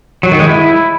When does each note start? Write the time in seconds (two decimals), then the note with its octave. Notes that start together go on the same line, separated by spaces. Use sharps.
0.23 F#3
0.32 D#3
0.40 G#3
0.48 E4